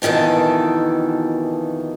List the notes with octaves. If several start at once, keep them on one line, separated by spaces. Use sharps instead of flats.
F2 B2 D#3 E3 A4